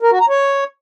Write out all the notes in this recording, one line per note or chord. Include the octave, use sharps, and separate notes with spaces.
A#4
F#4
A#5
C#5